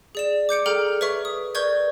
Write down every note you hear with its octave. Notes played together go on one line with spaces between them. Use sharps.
G#4 D5 E7
D6 G6 C#7 D7
G#4 A4 G5 A#5 F6
B4 C#5 E5 C#6
D#6
A#4 B4 D5 C#6 G6 G#6